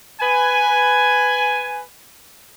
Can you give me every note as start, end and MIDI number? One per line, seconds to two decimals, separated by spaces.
0.21 1.80 71
0.21 1.80 80